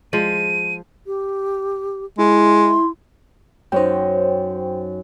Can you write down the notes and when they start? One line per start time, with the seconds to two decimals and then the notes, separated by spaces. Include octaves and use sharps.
0.13 F3 G#3 D#7
1.07 G4
2.18 G#3 E4 C6
3.72 F#2 D#4 C5 C#5 G5